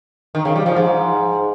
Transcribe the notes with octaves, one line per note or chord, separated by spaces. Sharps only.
D#3
C#3
G3
F3
G#2